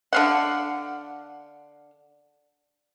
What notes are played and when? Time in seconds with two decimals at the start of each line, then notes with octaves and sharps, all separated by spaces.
0.13 D3 F5 F#5